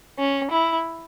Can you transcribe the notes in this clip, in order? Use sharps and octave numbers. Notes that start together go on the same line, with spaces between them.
C#4
E4